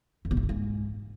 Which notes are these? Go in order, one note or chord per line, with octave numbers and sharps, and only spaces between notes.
F2
B2
G#2
A#2
G#2